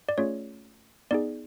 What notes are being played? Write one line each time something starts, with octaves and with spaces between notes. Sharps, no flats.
D5
A3 C#4 F4 G#4 C#5
B3 D#4 G#4 D5